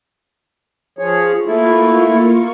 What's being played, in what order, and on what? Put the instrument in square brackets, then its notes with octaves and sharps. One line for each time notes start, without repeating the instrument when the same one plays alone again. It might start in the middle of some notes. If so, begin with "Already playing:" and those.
[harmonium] F3 G#4 C#5
[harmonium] A3 E4 [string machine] A#3 F4 C#6